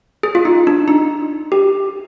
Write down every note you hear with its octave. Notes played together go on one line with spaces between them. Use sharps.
G#4
F4
D#4
D4
D#4
G4